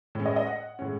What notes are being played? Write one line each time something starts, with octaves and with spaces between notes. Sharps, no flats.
A2 G#3 C#4
D#5
D#5
F#5
A2 G#3 C#4